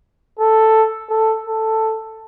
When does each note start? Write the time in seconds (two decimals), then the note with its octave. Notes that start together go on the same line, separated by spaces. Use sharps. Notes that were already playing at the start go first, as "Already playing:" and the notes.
0.39 A4
1.10 A4
1.47 A4